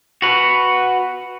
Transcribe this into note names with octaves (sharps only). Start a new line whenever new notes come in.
F#4 B4